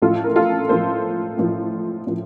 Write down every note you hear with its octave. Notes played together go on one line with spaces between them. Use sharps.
A1 A2 F3 F4 A4
A#4
F4 A4
A1 A2 F3 A4 C5
A1 A2 F3
A2 F3